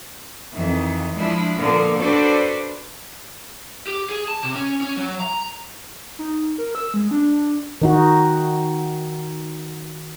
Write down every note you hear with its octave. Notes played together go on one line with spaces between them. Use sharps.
F2 D#3 E3
F3 G#3 D4 E4
A#2 D3 F3 A#3 B3 A#4
D4 F#4 A4 B4 C5 D5
G4
G#4
A5
C3
C#4
C#4
F#3
A#5
D#4
A#4
E6
G#3
D4
D#3 D#4 F#4